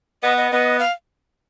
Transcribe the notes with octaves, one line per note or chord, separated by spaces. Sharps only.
B3 D#5
D#5
B3 D#5
F5